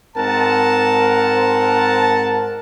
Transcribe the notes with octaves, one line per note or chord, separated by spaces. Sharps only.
G#2 C4 A#4 F#5 A5